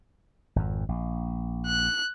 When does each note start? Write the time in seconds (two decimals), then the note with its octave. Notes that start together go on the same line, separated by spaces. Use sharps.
0.56 G#1 F2
0.89 A#1
1.67 F#6